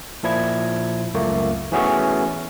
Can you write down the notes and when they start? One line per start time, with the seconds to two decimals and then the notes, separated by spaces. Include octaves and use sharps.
0.23 A#2 F3 E4 G#6
1.14 C#2 F#2 A3 A#3
1.72 E3 A3 B3 C#4 F#4 G#4